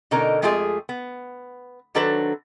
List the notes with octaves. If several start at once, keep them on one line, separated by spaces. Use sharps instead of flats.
B2 D3 C#4 D#4 A#4
F2 G#3 A3 F4 G4 G#4
B3
D#3 F#3 D4 A4 B4 C5